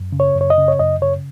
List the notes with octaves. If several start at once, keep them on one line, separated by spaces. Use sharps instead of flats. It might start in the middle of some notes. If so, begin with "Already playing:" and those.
Already playing: F#2
C#3
C#5
F#2
C#5
D#5
C#3
C#5
F#2 D#5
C#3 C#5